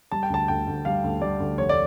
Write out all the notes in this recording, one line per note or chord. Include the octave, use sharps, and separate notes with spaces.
G3 A5
G5
D2 A5
D2 G5
D2
G3 F5
D2
G3 D5
D2
F1 C#5
D5